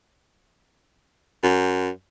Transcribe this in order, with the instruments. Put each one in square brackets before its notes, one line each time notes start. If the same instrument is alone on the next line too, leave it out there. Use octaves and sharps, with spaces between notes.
[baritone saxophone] F#2